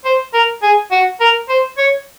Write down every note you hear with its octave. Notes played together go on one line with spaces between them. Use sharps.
C5
A#4
G#4
F#4
A#4
C5
C#5